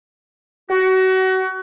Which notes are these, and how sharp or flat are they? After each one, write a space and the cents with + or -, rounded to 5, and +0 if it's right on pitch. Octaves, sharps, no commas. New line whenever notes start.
F#4 +30